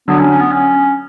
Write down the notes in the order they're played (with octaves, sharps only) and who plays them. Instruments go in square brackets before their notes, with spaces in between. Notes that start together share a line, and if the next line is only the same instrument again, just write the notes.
[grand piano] D3 F#3 [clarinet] B3
[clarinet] C#4
C#4
B3
C#4